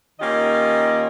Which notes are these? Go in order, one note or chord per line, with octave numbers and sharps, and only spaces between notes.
D#3 A#3 C#4 F4 G4 D#5